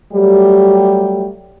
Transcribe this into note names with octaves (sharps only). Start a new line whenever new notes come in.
F#3 G3 A3 G4